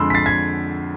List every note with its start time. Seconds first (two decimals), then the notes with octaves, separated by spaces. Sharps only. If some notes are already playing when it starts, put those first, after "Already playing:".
Already playing: F2 D3 G#3 B5 C6 E6
0.10 B6
0.15 A6 C7
0.26 G#6 B6